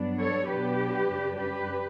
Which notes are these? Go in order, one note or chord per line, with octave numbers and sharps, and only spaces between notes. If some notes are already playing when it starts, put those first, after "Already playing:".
Already playing: G2 F#3 B3 D4
A4 C#5
B2 F#3 B3 D4 G4 B4
F#2 C#3 G3 D4
G4 B4